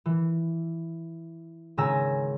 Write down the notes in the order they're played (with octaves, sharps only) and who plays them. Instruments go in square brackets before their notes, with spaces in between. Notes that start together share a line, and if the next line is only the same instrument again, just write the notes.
[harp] E3
G#1 C#3 G#5 A#5 E6